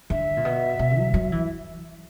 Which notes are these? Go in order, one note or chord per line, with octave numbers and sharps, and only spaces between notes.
D3 E5
A#2
B2
B2
F#3
F#3
E3